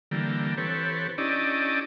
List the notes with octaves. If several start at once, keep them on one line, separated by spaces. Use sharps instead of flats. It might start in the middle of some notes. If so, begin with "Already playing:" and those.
D3 E3 G3 A#3
E3 C4 G4 A4 B4 C#5
C#4 D4 E4 G4 D5 D#5